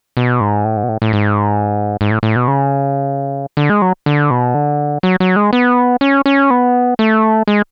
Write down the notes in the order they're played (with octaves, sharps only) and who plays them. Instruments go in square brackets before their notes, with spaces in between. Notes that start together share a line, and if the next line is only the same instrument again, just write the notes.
[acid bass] B2
G#2
A2
G#2
B2
A2
A2
G#2
G#2
A2
A2
B2
C#3
D3
G#3
F#3
D3
B2
D3
F#3
F#3
G#3
B3
C#4
C#4
B3
A3
G#3